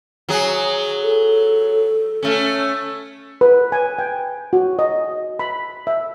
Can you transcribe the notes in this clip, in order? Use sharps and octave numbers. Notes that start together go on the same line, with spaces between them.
F#3 G#4
A4
A3 C#4
B4
G#5
G5
F#4
D#5
B5
E5